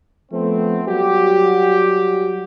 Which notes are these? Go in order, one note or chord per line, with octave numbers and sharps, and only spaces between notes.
F3 A3 B3 C4
F#3 G3 F#4 G4